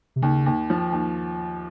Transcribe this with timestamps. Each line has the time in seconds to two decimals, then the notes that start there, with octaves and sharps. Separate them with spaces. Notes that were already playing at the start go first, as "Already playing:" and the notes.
0.16 C3
0.22 D#2 C#3
0.46 D#2
0.70 F3
0.93 D#2